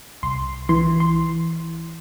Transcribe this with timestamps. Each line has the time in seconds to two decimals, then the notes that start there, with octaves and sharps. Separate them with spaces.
0.23 C2 C6
0.69 E3 C6
1.00 C6